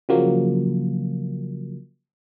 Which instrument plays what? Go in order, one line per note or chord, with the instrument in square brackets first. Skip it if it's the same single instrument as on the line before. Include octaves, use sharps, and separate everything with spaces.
[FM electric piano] C#3 F3 F#3 A#3